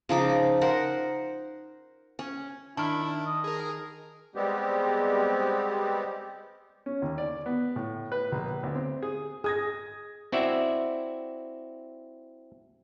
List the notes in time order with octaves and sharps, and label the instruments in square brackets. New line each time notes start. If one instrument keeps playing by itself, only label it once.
[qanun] C#3 F3 D#4 D6
A#4 C5 F#5
C#4
[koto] D#3 [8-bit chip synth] D4 [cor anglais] E4 [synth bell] A5 F6
[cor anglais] D#5
[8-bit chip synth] G#4 A#4
[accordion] G3 G#3 B3 C4 G4
[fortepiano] C#4
D#2
D5
B3
A2
B4
A#1
B4
D2
C4
G#4
[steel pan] G#4 [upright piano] D#6 G#6 A#6
[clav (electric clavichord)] C4 E4 F#4 D5 E5